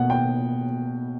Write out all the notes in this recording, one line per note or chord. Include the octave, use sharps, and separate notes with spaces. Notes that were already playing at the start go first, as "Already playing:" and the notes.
Already playing: B2 A#3 F#5
G5